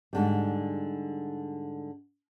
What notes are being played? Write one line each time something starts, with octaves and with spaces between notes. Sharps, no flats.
G#2 D3 G3